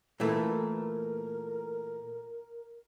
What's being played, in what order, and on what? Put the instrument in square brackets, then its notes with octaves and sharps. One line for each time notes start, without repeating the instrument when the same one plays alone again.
[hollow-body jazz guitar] A#2 E3 A3 [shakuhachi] A#4